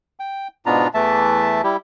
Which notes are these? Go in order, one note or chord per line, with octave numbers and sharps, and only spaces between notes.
G5
G#2 B2 B3 D4 F4 A#5
E2 E3 A3 E5 A5
G3 E4 G4